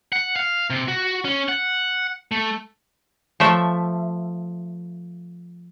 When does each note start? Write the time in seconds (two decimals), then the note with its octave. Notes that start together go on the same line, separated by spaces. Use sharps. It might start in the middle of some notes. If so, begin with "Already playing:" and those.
0.12 F#5
0.36 F5
0.70 C3
0.88 F#4
1.25 C#4
1.48 F#5
2.32 A3
3.40 F3 A3 E5